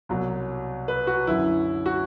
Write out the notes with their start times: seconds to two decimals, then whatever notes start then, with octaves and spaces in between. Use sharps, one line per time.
0.09 C2 B2 F#3
0.88 B4
1.07 F#4
1.27 F#2 D3 F#3 E4
1.86 F#4